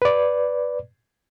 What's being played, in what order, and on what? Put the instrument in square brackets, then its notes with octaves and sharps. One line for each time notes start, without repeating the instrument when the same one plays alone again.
[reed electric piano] B4 D5